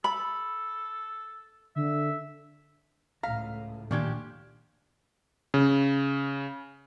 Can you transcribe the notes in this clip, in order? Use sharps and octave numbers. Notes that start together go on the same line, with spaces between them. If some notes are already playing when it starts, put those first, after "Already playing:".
A4 B5
D3 E5
C#2 A2 F5 A#5 B6
A#2 D#3 F3 D4 G4 C#6 G#6
C#3